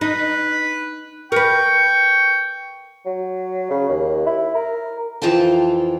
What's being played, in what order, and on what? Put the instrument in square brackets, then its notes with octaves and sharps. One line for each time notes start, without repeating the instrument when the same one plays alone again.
[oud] D#4 [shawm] B4
[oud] A#4 B4 [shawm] G5 [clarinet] C#6
[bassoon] F#3
C#3
D#2
E4
A#4
[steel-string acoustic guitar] F2 E3 F4 G5 A5